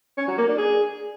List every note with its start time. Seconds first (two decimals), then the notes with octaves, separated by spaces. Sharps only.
0.18 C#4
0.28 F#3
0.38 A#3
0.48 D4
0.58 G#4